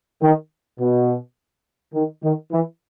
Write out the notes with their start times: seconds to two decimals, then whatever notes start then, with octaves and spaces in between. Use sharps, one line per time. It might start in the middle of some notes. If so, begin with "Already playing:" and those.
0.22 D#3
0.79 B2
1.94 D#3
2.23 D#3
2.52 E3